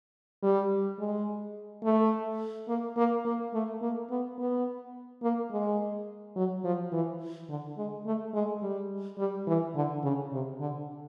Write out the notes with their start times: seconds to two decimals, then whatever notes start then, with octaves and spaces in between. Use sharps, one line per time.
0.43 G3
0.99 G#3
1.84 A3
2.68 A#3
2.97 A#3
3.25 A#3
3.54 A3
3.82 A#3
4.10 B3
4.38 B3
5.23 A#3
5.51 G#3
6.36 F#3
6.64 F3
6.93 E3
7.49 D3
7.78 G#3
8.06 A3
8.34 G#3
8.62 G3
9.18 G3
9.47 E3
9.76 D3
10.04 C#3
10.32 C3
10.60 D3